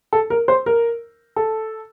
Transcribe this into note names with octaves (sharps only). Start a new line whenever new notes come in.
A4
A#4
C5
A#4
A4